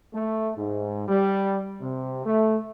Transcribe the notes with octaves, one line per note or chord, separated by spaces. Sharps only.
A3
G#2
G3
C3
A3